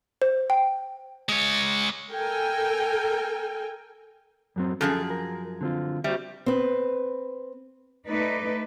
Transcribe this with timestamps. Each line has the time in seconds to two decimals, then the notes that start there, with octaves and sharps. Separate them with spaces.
0.22 C5
0.50 G5
1.29 G#3 C#5
2.12 A4 A#4 G5 G#5
4.56 F#2 F#3 C4
4.81 F#2 F3 G#4 A4
5.10 A#4
5.61 D3 C4 F4
6.04 G3 F#4 C5 E5
6.46 C4 B4
8.05 A3 D#4 B4 D5